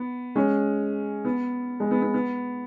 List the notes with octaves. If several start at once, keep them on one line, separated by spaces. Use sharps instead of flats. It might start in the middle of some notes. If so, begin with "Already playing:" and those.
Already playing: B3
G#3 C#4
B3
G#3
B3
B3
B3